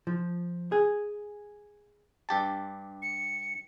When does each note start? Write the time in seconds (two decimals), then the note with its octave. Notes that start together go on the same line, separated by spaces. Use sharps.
0.07 F3
0.72 G#4
2.29 G2 G4 A5
3.02 C#7